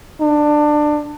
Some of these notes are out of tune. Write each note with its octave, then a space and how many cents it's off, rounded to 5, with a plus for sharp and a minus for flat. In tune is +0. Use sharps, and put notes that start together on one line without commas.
D4 +20